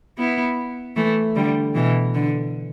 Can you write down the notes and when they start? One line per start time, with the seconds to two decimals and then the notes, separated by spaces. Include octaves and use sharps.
0.18 B3 E4
0.96 E3 A3
1.35 D3 G3
1.75 B2 E3
2.14 D3